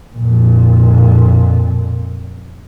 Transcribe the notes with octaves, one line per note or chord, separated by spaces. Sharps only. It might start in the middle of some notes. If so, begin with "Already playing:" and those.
F2 A#2